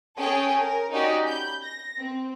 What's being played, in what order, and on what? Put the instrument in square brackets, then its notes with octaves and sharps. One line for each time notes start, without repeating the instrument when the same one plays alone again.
[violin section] C#4 G#4 A4 C#5 G5 G#5
A#4
C#4 D#4 F#4 G4 D5
B5 G6
A#6
C4